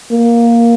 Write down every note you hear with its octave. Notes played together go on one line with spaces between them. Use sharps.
A#3